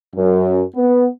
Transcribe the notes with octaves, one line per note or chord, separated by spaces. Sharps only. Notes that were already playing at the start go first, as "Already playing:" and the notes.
F#2
B3